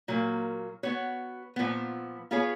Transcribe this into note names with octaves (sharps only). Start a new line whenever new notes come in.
A#2 F#3 A#3
B3 F#4 C#5
A#2 F3 B3
B3 F4 G#4 C#5